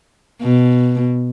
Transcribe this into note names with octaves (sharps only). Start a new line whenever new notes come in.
B2